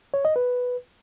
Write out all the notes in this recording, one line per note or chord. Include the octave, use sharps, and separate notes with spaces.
C#5
D#5
B4